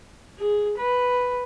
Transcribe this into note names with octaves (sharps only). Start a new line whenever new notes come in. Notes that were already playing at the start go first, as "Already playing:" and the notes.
G#4
B4